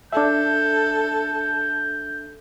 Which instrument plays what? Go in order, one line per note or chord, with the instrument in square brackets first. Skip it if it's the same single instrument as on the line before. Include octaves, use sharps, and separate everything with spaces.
[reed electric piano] D4 E5 [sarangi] A4 [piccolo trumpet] G6